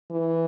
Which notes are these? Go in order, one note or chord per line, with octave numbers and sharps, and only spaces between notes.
E3